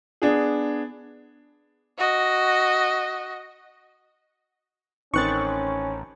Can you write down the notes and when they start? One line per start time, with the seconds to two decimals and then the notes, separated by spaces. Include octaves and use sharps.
0.22 B3 D4 G#4
1.98 F#4 D#5
5.14 A1 D#3 C4 C#4 D#4 C#6 F#6 A6